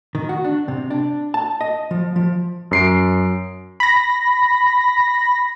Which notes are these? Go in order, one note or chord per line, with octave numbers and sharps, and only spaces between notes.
D#3
F#4
D4
C3
D4
A5
D#5
F3
F3
F#2 C7 D7
B5 A#6